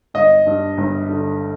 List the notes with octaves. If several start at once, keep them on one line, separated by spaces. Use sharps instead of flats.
G1 D#5
G2
G1
D3